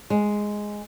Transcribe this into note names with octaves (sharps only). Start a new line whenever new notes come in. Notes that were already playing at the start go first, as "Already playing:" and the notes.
G#3